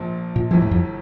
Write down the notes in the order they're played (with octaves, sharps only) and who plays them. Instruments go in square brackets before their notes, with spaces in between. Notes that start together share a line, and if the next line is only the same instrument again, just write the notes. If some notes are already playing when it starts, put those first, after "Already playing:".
Already playing: [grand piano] A#1 A#2 F3
[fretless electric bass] A#2
[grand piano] G1 G2 E3 [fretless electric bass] F3
[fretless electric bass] A2
F2